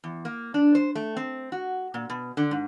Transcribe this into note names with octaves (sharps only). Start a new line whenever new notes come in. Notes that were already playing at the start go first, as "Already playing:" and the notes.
E2
A#3
D4
C5
A3
C4
F#4
A#2
B2
D3
G#2